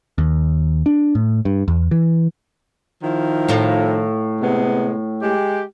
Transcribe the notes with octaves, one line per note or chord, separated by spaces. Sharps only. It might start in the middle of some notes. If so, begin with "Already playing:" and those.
D#2
D4
A2
G2
E2
E3
D#3 F3 E4
A2 F4 A4
C3 G#3 B3
G#3 G4